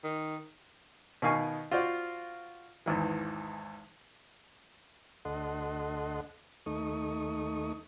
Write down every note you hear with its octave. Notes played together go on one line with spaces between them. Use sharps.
D#3
B2 D#3 F5 G#5 C#6
F4 F#4 C5 D5
G#1 E2 E3
D2 A4 D#5 F#5 C6
D#2 A3 D#4 C#6 D#6